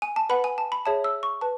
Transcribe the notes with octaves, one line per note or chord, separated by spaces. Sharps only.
G#5
A5
B4 F#5 B5
G#5
A5
B5
G#4 C#5 E5 A5
E6
C#6
B4 A5